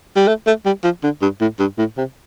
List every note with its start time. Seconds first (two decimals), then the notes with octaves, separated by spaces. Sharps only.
0.16 G3
0.27 A3
0.47 A3
0.65 G3
0.84 F3
1.03 D3
1.22 G2
1.41 A2
1.59 G2
1.78 A2
1.98 C3